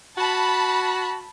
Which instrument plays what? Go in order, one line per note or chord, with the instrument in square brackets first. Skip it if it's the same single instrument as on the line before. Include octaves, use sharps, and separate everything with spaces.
[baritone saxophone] F#4 [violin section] A5 B5